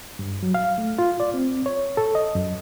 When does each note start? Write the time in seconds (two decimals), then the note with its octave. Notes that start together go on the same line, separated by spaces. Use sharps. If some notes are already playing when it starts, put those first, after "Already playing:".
0.19 G2
0.43 F#3
0.54 F5
0.78 A3
0.99 F4
1.20 D5
1.34 C4
1.66 C#5
1.97 A4
2.15 D#5
2.35 F#2